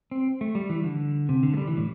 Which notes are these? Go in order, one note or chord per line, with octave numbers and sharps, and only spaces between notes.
C4
A3
G3
E3
D3
C3
D3
A3
G3
E3
A2